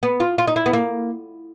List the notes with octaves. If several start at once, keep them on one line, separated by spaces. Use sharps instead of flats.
B3
F4
F4
D#4
E4
B3
A#3